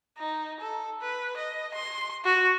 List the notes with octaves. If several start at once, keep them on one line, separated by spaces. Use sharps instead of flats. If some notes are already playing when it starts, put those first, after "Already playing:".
D#4
A4
B4
D#5
C6
F#4